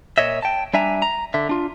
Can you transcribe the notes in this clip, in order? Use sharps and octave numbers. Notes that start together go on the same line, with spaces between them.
A#2 C#5 D#5 E5
G5 A5
G3 D4 E5 G#5 A#5
A#5
D3 E5
D4 F4